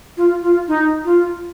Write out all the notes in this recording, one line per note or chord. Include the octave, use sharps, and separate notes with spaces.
F4
F4
D#4
F4